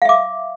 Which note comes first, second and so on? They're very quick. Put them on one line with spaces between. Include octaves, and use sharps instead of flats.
F5 E5 D6